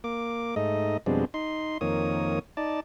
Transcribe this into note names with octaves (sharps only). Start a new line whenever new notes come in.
A#3 D6
G#2 A3 D#4 D#5
F2 B2 G3 G#3 C4 D4
D#4 C6
F2 D#3 A#3 C#5 D#6
D#4 D5 A5